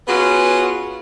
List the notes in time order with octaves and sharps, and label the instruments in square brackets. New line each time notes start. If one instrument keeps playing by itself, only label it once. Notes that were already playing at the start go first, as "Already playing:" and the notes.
[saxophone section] B3 C#4 F4 F#4 G#4